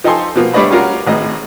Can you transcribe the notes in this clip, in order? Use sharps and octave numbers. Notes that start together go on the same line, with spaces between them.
F3 D#4 G4 A4 G#5 C6
B2 F3 A#3
G3 A3 D4 C#5 D#5 B5
G3 C#4 F4 F#4 A#4
G#1 A2 D#5